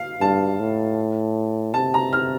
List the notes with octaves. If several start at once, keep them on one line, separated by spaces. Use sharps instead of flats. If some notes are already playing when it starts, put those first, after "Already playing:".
Already playing: F5
G2 A5
A2
C3 A5
A#5
F6